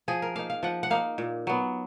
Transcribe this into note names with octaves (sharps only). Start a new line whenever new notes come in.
F3 G#4
A#4
A#3 D#4 F5
F5
F3 F#5
F#5
A#3 D#4 F5
A#2
F#3 B3